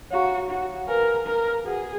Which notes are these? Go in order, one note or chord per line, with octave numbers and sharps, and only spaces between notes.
F#4 C#5 F5 A#5 C#6
F#4
A#4 B4 F5 G#5
A#4
F#4 G#4 B4 F#5